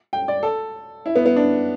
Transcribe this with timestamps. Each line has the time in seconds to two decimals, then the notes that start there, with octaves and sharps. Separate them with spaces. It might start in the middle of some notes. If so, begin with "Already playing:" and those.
0.13 G5
0.28 D5
0.43 A4
1.06 E4
1.15 B3
1.26 B3
1.36 D4